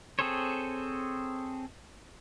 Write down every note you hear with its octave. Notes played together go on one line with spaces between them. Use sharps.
C4 G#4 A4 C5 C#5